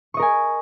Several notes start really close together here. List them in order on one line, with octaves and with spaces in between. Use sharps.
C#6 D#5 A#4 G#5